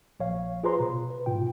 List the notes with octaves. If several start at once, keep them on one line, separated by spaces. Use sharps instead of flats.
A#1 C#5 F5
F4 G#4 B4 C5 A#5 C6
B2
B4
G#2 B2 F4 G5